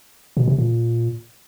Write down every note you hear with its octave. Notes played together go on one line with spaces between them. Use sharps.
B2
C3
A#2